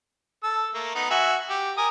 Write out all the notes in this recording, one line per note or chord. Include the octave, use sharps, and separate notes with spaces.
A4 E6
A3 A#3
B3 D#4
F#4 E5 G#5
G4
A#4 G#5 D#6